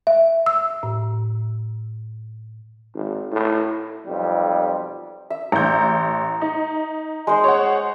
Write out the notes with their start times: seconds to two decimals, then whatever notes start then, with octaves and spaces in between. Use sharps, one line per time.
0.07 E5
0.46 E6
0.83 A2
2.94 G#1
3.32 A2
4.06 B1 F2 G3
5.30 E5
5.52 A1 A#5 G6
6.42 D#4
7.27 G#3 C5 D#5
7.44 C#5 F#5